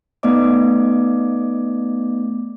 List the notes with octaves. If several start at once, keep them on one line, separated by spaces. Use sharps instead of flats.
A3 B3 D#4 D5 D#5 D6